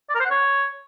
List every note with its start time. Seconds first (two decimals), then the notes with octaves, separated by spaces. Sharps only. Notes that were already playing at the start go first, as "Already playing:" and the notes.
0.10 D5
0.15 A#4
0.20 C5
0.25 F#5
0.30 C#5